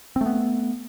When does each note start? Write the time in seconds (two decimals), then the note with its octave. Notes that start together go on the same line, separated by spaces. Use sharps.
0.16 C4
0.21 A3
0.26 B3